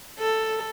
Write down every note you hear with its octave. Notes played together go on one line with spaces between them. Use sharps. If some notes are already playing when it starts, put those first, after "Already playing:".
A4